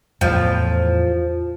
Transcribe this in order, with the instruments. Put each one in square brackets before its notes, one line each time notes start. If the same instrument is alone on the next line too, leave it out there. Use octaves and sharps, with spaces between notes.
[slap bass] E2 A2 [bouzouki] F3